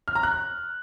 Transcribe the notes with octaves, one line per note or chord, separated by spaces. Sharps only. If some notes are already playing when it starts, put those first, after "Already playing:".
F6
A#5
F#6